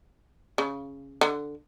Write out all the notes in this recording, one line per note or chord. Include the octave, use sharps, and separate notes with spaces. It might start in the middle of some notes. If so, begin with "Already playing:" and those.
C#3
D3